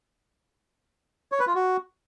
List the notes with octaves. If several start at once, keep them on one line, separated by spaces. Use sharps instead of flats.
C#5
B4
F4
F#4